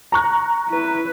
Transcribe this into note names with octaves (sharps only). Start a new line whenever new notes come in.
A#5 C#6 F#6
E4 B4